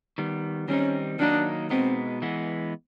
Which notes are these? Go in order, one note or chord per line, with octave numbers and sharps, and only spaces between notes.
D#3 G3 B3
D#3 G3 C4 C#4 D#4
D#3 F#3 A#3 D4 D#4
B2 G#3 B3 C4 D#4
E3 G#3 B3